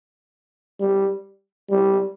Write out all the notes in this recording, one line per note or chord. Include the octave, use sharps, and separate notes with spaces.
G3
G3